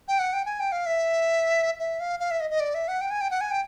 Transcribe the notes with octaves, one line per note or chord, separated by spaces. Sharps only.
G5
F#5
G5
G#5
G5
F5
E5
E5
F5
F5
E5
D#5
D#5
D5
E5
F#5
G5
G#5
G5
F#5
G#5
G5